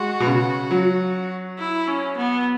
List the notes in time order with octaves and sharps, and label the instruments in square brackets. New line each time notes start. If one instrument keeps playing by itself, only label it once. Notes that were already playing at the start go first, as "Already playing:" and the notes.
Already playing: [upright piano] G#3 [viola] F#4
[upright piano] B2
C#3
F#3
[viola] E4
C#4
B3